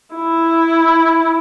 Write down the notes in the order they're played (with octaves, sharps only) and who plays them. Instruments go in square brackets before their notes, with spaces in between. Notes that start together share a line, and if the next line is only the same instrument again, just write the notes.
[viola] E4